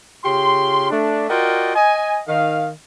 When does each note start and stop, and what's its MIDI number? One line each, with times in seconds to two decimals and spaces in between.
0.25 0.90 49
0.25 0.90 65
0.25 0.90 67
0.25 0.90 84
0.90 1.27 57
0.90 1.27 62
1.30 1.75 65
1.30 1.75 66
1.30 1.75 70
1.30 1.75 74
1.30 1.75 75
1.30 1.75 79
1.76 2.21 75
1.76 2.21 80
2.28 2.70 51
2.28 2.70 77